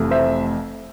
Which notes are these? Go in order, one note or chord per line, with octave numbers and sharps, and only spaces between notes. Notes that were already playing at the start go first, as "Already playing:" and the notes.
Already playing: F1 F2 C3 E3 A3
C5 E5